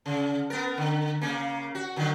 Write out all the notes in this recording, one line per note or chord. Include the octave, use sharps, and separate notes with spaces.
C#3
B3 A#4
D3
C#3 A#3
F#4
D3 D#3 F#3